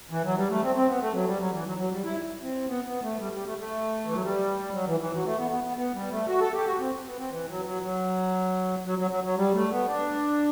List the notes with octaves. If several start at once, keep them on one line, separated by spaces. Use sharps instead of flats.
E3
F#3
G3
A3
C4
C4
B3
A3
F#3
G3
F#3
E3
F#3
F#3
G3
E4
C4
B3
B3
A3
G3
G3
A3
A3
E3
F#3
G3
F#3
E3
E3
F#3
A3
B3
B3
B3
B3
G3
A3
F#4
A4
G4
F#4
C4
B3
C4
E3
F#3
F#3
F#3
F#3
F#3
F#3
F#3
G3
A3
B3
D4